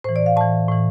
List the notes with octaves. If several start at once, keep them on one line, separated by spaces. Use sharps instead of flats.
A2 E3 C5
D5
F5
A2 E3 A5
A2 E3